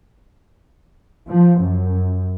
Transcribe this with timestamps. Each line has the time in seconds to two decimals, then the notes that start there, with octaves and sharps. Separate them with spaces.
1.29 F3
1.60 F#2